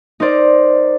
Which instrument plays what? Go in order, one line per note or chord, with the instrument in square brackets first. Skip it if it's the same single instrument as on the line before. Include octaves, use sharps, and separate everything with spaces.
[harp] D#4 A#4 C5 D5